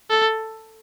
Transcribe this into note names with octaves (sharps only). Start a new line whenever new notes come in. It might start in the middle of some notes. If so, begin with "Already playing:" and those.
A4